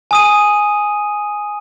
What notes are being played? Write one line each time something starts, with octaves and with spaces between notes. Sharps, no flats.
G#5 D#6 D#7